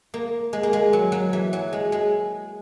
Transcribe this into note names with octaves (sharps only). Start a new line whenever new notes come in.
A#3
G#3
A#3
G#3
F#3
F#3
E3
F#3
G#3
G#3